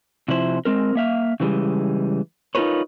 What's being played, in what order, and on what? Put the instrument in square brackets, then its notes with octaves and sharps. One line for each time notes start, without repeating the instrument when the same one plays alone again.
[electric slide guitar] C3 F3 E4 C5
G#3 C4 A#4
A#3 E5 F5
C#3 E3 G3 G#3
D#4 F4 G4 A#4 B4 C#5